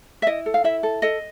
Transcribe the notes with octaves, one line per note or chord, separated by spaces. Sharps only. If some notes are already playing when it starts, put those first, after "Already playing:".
E5
E4 D#5
A4
F5
E4 E5
A4
A4 D#5